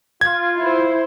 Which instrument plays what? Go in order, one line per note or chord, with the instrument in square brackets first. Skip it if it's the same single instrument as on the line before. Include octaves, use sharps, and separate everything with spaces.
[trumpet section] F4 [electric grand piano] G#6
[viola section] E4 C5